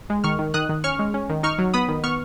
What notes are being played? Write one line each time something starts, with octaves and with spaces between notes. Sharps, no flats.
G#3
D#3 C#6 F6
D#3
D#3 D#6 F#6
D#3
C#4 C#6 F6
G#3
C#4
D#3
D#4 C#6 F6
F#3
B3 B5 D#6
D#3
B3 C#6 F6